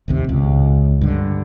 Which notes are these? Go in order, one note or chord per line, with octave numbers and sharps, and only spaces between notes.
A1 D#2 C3
C#2
G2 D3